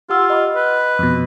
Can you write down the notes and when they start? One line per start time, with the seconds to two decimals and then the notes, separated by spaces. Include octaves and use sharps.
0.10 F4 G4 F#5 E6
0.30 D#5 B5 D6
0.56 B4
0.99 F2 B2